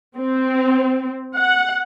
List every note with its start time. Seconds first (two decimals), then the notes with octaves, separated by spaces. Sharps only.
0.16 C4
1.37 F#5